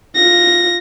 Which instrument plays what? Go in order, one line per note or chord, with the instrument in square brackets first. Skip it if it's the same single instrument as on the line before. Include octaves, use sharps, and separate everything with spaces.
[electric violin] F4 A#6